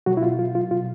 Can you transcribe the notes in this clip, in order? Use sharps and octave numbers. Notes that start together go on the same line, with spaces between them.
B2 F#3 F#4
E4
B2 F4
F#3 F4
F#3 F4
B2 F4